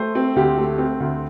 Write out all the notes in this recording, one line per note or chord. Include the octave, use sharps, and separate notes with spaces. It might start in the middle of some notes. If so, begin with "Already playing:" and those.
Already playing: A3 C5
C4
D2 G4
A3
C4
D2